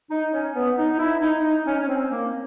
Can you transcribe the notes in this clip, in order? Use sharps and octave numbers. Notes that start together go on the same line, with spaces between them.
D#4
C#4
B3
D#4
E4
D#4
D#4
C#4
C#4
C4
A#3